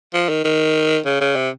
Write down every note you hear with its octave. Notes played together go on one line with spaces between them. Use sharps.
F3
D#3
D#3
C#3
C#3
C3